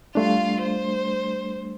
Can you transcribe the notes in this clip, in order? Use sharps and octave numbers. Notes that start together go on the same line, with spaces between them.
G3 A3 D4 F4 F5
C5